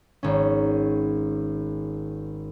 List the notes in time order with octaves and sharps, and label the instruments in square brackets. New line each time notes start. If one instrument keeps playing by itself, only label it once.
[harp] G#1 C#4